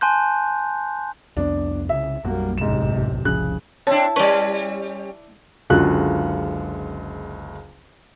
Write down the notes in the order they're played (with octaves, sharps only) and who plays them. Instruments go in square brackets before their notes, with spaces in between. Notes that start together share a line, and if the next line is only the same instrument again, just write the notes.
[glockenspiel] G#5 A5 C6 F#6 G6
[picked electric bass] C2 F2 B3 [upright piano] D4
[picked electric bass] C2 C#3 [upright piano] E5
[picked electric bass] B1 F#2 [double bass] G3 A#3 [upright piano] F#4
[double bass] A1 C3 [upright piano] G#2 E7
[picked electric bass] F1 C2 F3 [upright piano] C#3 F#6
[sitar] C4 D4 [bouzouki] E4 A5 [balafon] C#5
[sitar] G3 C#4 [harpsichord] B4 D5 [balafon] C#6
[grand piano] F#1 C#2 D3 F4 F#4 F#6